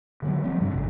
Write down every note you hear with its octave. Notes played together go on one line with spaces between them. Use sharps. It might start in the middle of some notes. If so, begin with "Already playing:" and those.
D3 F3 F#3 B3
F3 G3 C4
G2 C#3 D4
G#1 F2 C#3